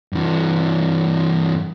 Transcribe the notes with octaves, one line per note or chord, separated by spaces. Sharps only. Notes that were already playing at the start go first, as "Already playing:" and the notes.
G2 E3